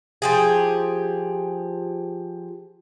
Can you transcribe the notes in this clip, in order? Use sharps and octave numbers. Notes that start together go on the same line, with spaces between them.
F3 G4 G#4